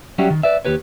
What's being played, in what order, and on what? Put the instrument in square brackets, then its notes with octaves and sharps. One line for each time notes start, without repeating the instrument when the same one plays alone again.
[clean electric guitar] F#3 G3 C#4 F#4 G4 E5
D#3
B4 D5 E5
D#2 G4 B4 C#5